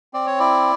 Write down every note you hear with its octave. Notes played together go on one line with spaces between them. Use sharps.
C4 D5
C#5
E4 D5